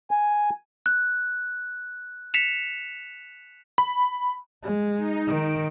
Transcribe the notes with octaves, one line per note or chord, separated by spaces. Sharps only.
G#5
F#6
B6 C#7 E7 F7
B5
G#3
D#4
D#3 D7